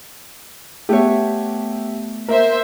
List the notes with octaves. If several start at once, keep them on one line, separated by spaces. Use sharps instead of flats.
A3 B3 G4 C#5 E5
A#3 A#4 C5 E5